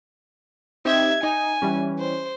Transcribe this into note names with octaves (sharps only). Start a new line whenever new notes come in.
C4 D#4 G4 E5 G#6
D#4 G#5
E3 G3 C#4
C5